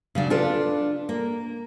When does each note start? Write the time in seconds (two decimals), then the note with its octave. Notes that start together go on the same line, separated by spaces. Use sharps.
0.15 C#3 F#3 D4
0.30 D4 F4 A4 B4 D5
1.09 A#3